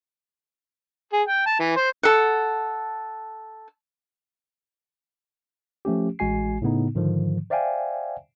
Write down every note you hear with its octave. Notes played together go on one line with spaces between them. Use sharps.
G#4
G5
A5
E3
C5
A4 F#5
F3 A3 C#4 G4
A1 G#3 F#4 G#5 C7
A2 C#3 B3 D#4
G#2 D3 D#3 F3
C5 D5 E5 F5 G5 G#5